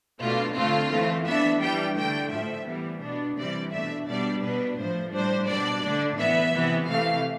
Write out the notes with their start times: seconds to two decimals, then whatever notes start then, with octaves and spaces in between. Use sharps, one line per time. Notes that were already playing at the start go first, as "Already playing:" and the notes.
0.20 B2 A3 D4 F4
0.56 D3 A3 C4 F4
0.90 E3 A3 C4
1.26 E3 B3 D4 E5
1.61 E3 G3 D4 G5
1.97 D3 A3 D4 G5
2.31 A2 F3 A3 E5
2.67 E3 G3 B3
3.02 B2 B3 D4
3.37 C3 E3 G3 C4 D5
3.72 B2 A3 D4 E5
4.08 B2 G3 B3 D4 D5
4.42 B2 B3 D4 B4
4.78 A2 F3 A3 C5
5.13 A2 G3 D4 C5
5.48 B2 G3 D4 D5
5.83 D3 A3 D4
6.18 A2 E3 B3 E5
6.54 C3 E3 B3
6.89 C3 E3 A3 F5